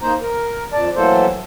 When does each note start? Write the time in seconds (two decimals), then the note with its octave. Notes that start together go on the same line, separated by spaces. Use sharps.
0.01 A#3 D#4 C5 A#5
0.21 A#4
0.73 F2 D5 A5
0.96 E3 F#3 A3 A#3 A4 C5